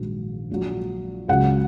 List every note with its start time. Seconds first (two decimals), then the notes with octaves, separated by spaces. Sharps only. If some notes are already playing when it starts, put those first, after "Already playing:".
Already playing: A#1 G#2 D#3 F#3
0.50 A#1 A#2 F#3
1.28 C#2 C#3 F#3 F#5